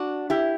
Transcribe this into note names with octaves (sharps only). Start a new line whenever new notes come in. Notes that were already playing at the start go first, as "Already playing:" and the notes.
Already playing: D4 F#4
E4 G4